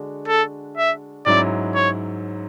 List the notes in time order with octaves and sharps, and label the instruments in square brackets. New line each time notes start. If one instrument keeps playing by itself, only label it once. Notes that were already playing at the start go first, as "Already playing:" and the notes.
Already playing: [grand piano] D3 G#3 D4 F#4
[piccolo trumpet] A4
E5
[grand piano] G#2 F#3 C#4 E4 [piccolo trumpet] D5
[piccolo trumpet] C#5